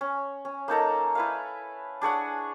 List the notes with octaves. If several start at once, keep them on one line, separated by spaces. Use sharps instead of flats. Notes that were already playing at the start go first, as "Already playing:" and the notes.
C#4
C#4
A#3 D#4 A4 A#5
E4 B4 F5
D4 G#4 C#5 F#5